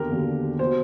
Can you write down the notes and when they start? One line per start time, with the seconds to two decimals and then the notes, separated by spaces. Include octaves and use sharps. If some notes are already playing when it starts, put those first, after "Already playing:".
Already playing: E1 D#2 D3 G4 A#4
0.10 E1 D#2 D3
0.59 B2 C5